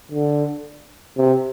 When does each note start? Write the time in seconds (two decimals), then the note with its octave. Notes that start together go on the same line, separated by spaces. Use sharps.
0.12 D3
1.17 C3